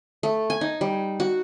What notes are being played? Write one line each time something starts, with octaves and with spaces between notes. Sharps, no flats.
A3
G#5
D#4
G3
F#4